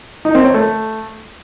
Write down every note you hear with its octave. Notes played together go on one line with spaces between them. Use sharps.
D#4
C4
C#5
A3